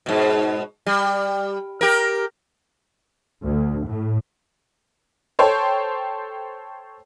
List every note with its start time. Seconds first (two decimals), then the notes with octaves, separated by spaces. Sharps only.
0.06 G#2 B2
0.86 G3
1.81 G4 A#4
3.43 D2
3.87 A2
5.39 A4 C5 C#5 G5